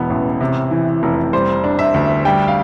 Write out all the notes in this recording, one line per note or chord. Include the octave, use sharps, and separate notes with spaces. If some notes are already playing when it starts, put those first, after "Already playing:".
Already playing: E1 E3 B3
A1
C3
E3
F1
G3 C5
D4
E5
D2
G3 G5
F5